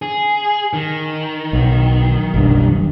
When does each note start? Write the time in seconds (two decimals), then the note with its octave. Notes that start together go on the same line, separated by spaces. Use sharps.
0.02 G#4
0.73 D#3
1.53 B1
2.34 F#1 B1 G2